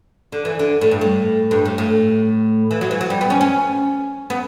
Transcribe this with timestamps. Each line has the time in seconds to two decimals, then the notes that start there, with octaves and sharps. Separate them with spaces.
0.32 D3
0.45 E3
0.59 D3
0.81 A2
0.91 G2
1.01 A2
1.51 G2
1.65 A2
1.78 A2
2.71 E3
2.81 F#3
2.91 E3
3.01 F#3
3.10 G3
3.21 B3
3.30 C#4
3.41 C#4
4.30 B3